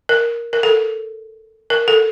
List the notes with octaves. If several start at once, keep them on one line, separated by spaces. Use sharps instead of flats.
A#4
A#4
A4
A#4
A4